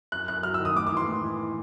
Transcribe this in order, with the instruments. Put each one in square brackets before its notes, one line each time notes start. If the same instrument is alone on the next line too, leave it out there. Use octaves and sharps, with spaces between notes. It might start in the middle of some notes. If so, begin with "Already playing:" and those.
[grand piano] F#2 F#6
F#2 F#6
F#3 F6
E6
D#3
D#6
A2 D6
D6
E3 C6
A2
E3